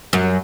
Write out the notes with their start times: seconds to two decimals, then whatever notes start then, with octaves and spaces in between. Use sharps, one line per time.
0.13 F#2